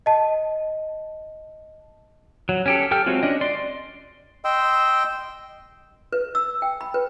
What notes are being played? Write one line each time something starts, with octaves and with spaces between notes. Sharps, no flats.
D#5 A5
F#3
C#4 G4 A4
G4 A4 G5 F6
F#3 G#3 C4 F4 F#4
C#4 D4 D#5
D5 C6
D#5 G5 C6 E6
B4
E6
G5
B5
B4